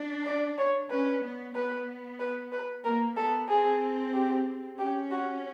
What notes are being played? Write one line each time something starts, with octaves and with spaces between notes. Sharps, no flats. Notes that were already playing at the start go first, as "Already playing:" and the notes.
Already playing: D4
D5
C#5
C#4 B4
B3
B3 B4
B4
B4
A#3 A#4
B3 A4
C4 G#4
G4
C#4 G4
F#4